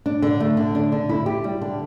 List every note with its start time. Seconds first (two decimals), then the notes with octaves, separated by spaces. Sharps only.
0.06 D4
0.22 D3
0.40 A3
0.57 D3
0.75 D4
0.92 D3
1.09 E4
1.26 G4
1.44 G3
1.62 D3